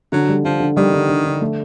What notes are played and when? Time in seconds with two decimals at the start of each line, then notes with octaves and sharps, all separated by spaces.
0.12 D3 F#3
0.29 G3
0.44 D3 F3
0.60 D3
0.77 D#3 G3
0.93 D3
1.09 D3
1.25 D3
1.41 A3